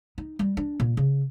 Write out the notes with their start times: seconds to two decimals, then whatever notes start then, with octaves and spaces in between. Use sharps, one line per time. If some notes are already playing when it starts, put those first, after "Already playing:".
0.18 D#4
0.39 G3
0.57 D4
0.80 A#2
0.97 C#3